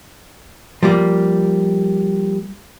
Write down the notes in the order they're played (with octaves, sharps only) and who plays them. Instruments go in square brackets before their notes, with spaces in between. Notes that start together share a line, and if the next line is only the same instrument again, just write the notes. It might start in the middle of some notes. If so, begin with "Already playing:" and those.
[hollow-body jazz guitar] F3 G3 A#3